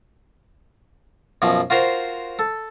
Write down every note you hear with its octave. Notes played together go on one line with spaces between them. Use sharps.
F#2 B2 F3
F4 F#4 A#4 C5
A4